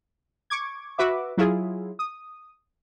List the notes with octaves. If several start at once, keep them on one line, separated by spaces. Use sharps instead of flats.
C#6 D6 G#6
F#4 B4 E5 D6
F#3 E4 F4 G#4
D#6